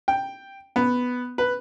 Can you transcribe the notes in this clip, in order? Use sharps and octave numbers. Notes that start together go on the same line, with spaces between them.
G5
B3
B4